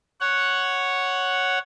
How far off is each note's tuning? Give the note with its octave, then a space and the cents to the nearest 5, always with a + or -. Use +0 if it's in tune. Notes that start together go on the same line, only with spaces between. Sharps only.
C#5 +0 F#5 +0